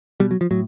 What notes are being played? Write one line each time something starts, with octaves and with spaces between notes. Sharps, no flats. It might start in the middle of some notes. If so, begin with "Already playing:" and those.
B2 G3
F#3
F3
A2 F#3